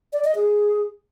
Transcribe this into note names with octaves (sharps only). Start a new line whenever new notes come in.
D5
D#5
G#4